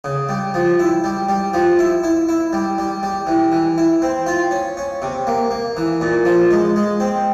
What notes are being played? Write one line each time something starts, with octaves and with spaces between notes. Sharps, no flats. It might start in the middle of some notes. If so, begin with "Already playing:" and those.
C#3
G3
F3
E4
G3
G3
F3
E4
E4
E4
G3
G3
G3
E3
E3
E4
C4
F4
C#4
C#4
C3
A#3
A#3
E3
A#2
F3
G#3
G#3
C4